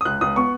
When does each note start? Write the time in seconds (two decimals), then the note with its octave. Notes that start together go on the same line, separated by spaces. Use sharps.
0.01 D#6
0.05 C#2 F#6
0.21 C#2 D#6
0.36 B3 C#6